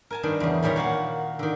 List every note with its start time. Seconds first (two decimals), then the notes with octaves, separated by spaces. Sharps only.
0.11 A#4 G#5 A5
0.23 G2 D#3 D4
0.40 E2 C#3
0.63 A#2 D#3 G3 C#5 A#5
0.76 A#2 F#4 F5 F#5
1.39 D3 D#3